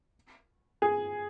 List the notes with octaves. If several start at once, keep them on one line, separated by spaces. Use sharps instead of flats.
G#4